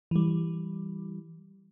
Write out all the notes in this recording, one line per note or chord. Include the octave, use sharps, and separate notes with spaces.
E3 G3